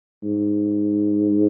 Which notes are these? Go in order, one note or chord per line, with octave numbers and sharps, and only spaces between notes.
G#2